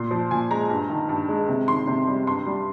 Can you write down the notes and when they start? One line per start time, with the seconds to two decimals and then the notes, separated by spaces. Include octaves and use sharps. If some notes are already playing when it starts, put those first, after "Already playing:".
Already playing: A#2 C6
0.11 F3
0.31 A#2 G#5
0.51 G#3 A#5
0.69 G2
0.90 D#3
1.09 G2
1.29 G#3
1.48 C3
1.68 D#3 C6
1.87 C3
2.07 G3
2.27 G2 C6
2.46 G3